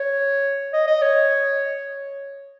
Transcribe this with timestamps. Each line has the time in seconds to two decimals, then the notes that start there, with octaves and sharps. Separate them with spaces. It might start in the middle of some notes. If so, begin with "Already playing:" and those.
Already playing: C#5
0.73 D#5
0.87 D#5
1.02 C#5